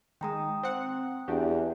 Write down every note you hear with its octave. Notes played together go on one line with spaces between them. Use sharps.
D#3 G#3 G5 A#5 D#6
C4 F#5
E2 D4 F#4 G4